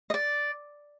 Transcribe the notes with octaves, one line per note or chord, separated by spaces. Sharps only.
D#5
D5